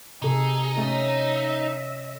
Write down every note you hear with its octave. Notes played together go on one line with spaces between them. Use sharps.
C3 D#4 G#4 A4
A3 C#4 D#5 E5